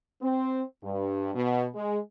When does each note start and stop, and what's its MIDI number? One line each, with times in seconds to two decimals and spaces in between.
0.22 0.63 60
0.83 1.30 43
1.35 1.66 47
1.75 1.97 56